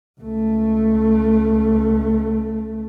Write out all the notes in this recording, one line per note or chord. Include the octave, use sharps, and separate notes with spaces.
C#2 A3